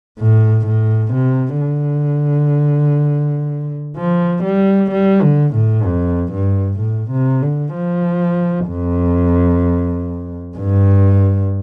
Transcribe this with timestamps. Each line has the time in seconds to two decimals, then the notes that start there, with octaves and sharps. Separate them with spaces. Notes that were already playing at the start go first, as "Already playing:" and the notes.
0.19 A2
0.67 A2
1.13 C3
1.61 D3
3.96 F3
4.44 G3
4.91 G3
5.22 D3
5.54 A2
5.85 F2
6.33 G2
6.79 A2
7.11 C3
7.42 D3
7.74 F3
8.69 F2
10.57 G2